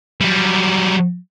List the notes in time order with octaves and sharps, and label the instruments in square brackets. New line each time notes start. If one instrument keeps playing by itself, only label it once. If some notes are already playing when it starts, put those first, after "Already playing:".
[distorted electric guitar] F#3 G3